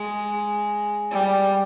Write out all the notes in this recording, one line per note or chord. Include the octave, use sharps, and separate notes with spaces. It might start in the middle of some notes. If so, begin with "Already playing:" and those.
Already playing: G#3
G3